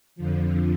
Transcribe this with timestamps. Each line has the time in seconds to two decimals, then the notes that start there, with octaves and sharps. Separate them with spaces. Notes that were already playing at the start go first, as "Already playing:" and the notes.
0.16 F2 D3 F3